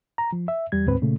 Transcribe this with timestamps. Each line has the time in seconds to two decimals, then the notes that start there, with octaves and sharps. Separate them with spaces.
0.18 A#5
0.33 F3
0.48 E5
0.72 E2 G3 G#6
0.86 D2 G#2 C4 B4
1.02 A#2 C#3 A3